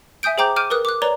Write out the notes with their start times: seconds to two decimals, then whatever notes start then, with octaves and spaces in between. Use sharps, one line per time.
0.23 E5 G#5 D#6 G6 D7
0.38 G#4 C5 G5 A#5 D6 G6
0.56 D6 F6 G6 D7 D#7
0.70 A#4 B4 D#6 F#6
0.85 D6 F#6
1.02 B4 C#5 D5 A#5 G7